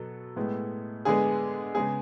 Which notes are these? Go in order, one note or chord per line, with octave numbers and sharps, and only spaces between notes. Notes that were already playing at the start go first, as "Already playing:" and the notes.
Already playing: B2 F#3 B3 A4
A2 G#3 B3
D3 G#3 B3 G#4
C#3 G#3 B3 G#4